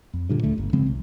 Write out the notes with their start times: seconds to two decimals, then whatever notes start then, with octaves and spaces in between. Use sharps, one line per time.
0.14 F2
0.29 G2 A#2 D3
0.43 D2 D3 A3
0.58 G1
0.73 C#3 F3 G#3 C4
0.86 C2